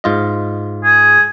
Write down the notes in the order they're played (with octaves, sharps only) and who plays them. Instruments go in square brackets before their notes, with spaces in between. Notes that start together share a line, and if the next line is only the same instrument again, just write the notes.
[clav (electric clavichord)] G#2 F4 D#5
[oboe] G#4